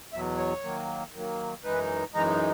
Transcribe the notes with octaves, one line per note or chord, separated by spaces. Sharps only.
E2 B2 F#3 E5
C#5
D#3 F#3 A#3
D#3 F#3 A#3
F#2 E3 G#3 D#4 B4
F#2 E3 G#3 D#4 A#5